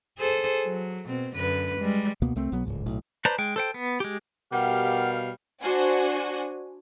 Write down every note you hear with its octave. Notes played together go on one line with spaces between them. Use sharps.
G#4 A4 C5
F#3
B2 C4
F#2 D3 B4
G3 G#3
C#2 B2 A#3 B3
C2 A3 C4
B1 B2 F#3 B3
D1 G#1 C#2 G#2
B1 A2
B4 C5 D5 A5 A#5
G#3 G5
A4 C5 G5
B3
G#3 G4
B2 G3 G4 A#4 F5 F#5
D4 F#4 C5 F#5 G#5